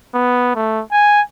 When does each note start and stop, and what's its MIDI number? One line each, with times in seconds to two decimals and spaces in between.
0.14 0.52 59
0.55 0.82 57
0.92 1.21 80